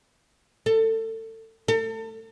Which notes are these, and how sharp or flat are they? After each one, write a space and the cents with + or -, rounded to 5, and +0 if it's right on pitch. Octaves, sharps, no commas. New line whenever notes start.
A4 +25
A4 +35